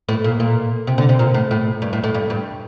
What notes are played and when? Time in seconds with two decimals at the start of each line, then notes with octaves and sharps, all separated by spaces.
0.09 A2
0.24 A#2
0.40 A#2
0.87 C3
0.98 D3
1.09 C3
1.19 A#2
1.34 A2
1.51 A2
1.82 G2
1.93 A2
2.04 A2
2.14 G2
2.30 G2